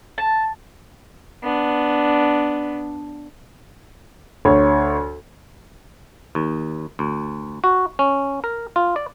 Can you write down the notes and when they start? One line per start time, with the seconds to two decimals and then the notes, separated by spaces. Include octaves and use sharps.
0.18 A5
1.44 B3 D4
4.45 D2 C#5 C#6
6.35 D#2
6.99 D2
7.64 F#4
7.99 C#4
8.44 A#4
8.76 F4
8.96 D5